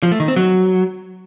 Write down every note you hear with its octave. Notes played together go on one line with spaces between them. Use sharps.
F3
A3
D#3
C4
F#3